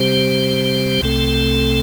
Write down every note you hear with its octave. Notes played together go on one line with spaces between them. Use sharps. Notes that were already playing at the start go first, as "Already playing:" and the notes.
Already playing: C3 G3 C4 G4 C5
C2 C3 A3 C4 A4